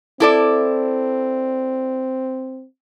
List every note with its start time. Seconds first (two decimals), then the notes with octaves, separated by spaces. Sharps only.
0.20 C4 E4 A4 D5